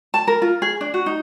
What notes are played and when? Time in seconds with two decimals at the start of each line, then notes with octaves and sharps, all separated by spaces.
0.14 A5
0.27 A#4
0.42 F4
0.62 G#4
0.81 D4
0.94 F#4
1.06 D#4